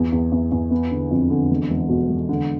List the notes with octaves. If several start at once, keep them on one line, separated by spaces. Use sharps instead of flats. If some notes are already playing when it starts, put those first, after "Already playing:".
Already playing: E2
E2
E2
E2
B3
D3
F2
D3
E1
E1
B2
E1
D3